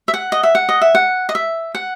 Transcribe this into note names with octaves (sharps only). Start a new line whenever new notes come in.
E5
F#5
D#5
E5
F#5
D#5
E5
F#5
D#5
E5
F#5